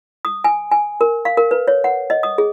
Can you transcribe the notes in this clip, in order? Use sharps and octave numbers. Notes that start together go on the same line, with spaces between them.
D#6
G#5
G#5
A#4
F5
A#4
B4
C#5
F#5
D#5
D#6
G#4